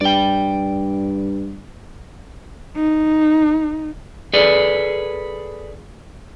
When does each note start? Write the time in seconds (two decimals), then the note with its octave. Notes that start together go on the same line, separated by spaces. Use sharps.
0.01 G2 D5 G5
2.76 D#4
4.34 G#4 A4 B4 D5